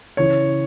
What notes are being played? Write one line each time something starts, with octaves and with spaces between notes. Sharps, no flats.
C#3 E3 C#5